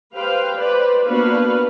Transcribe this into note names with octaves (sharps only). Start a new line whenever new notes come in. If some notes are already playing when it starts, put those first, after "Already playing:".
G4 B4 C5 F5 G5
B4 C5 D5
A#3 B3 D4 F#4 B4 F5